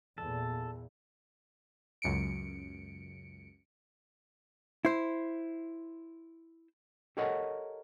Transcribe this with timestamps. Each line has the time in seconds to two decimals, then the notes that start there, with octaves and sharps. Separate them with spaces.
0.18 E2 A#2 A4
2.02 C#2 F#2 C#7 D7
4.85 E4 C5
7.17 G4 A4 A#4 C#5 D#5 F#5